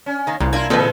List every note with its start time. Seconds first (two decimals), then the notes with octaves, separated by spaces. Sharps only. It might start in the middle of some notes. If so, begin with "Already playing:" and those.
0.06 C#4
0.27 D#3 A#3
0.40 C2 A#2
0.53 A#3 D4 E4 F4 G#6
0.70 A#2 D3 E3 G#3 C4 A4 B4